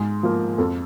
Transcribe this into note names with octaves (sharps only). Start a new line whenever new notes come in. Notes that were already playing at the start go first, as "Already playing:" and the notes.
Already playing: G#2 G#4
F3 A#3
F2 A4